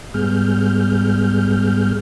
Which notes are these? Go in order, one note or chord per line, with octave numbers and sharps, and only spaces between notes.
G#2 G3 B3 G#4 F6 G6